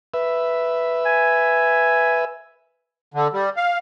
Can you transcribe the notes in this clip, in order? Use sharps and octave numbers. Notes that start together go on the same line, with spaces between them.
B4 E5
G#5
D3
G3
F5